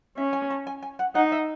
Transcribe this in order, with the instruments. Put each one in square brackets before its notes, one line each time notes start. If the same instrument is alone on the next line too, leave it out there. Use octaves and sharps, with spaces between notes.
[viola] C#4 [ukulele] E5
[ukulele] G#5
A5
G#5
G#5
F#5
[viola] D#4 [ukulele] F#5
[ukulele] E5